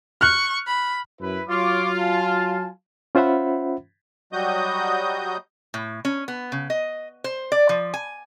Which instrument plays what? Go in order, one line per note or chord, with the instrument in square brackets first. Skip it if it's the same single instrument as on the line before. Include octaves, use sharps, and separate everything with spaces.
[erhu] C#6 [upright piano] F6 F#6
[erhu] B5
[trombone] F#2 [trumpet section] E4 B4
[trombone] F#3 [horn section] F4 [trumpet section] C#5 D6
[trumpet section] F5 G#5 A5
[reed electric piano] C#4 F4 C5 E5 F#5 B5
[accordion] F#3 G3 F#4 D#5 D#6 G6
[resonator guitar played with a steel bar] A2
C#4
B3
C#3
D#5
C5
D5
F3
G#5